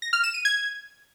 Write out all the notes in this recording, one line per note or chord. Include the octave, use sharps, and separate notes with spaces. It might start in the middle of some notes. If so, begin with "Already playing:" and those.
A#6
F6
E7
D#7
G#6